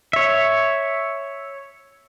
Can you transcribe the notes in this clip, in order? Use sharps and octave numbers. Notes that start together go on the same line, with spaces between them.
C#5 E5